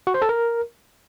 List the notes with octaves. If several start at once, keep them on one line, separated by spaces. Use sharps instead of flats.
F#4
C5
A4
A#4